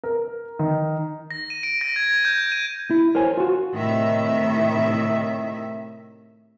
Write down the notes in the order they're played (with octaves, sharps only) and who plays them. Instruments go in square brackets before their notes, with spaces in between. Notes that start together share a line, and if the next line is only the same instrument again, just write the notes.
[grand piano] A#4
D#3
[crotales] A#6
D#7
D7
A#6
G#6
G#6
G6
G6
D#7
[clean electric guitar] E4
A#4 C5 C#5 G#5
F4 F#4
[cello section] A2 C3 D#3 E5